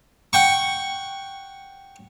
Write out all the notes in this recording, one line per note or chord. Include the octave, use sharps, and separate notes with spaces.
F#5 G5 C#6